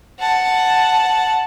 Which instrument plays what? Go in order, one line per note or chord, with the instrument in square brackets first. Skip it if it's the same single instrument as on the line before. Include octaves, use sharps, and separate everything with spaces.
[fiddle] F#5 A5